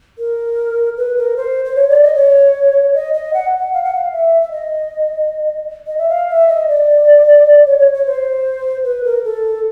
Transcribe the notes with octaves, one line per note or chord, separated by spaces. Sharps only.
A#4
B4
A#4
C5
C5
C#5
D5
D#5
C#5
D#5
D#5
F#5
F#5
F5
F#5
F5
E5
E5
D#5
D#5
E5
F5
E5
D#5
D5
C#5
C#5
C#5
C5
B4
A#4
A4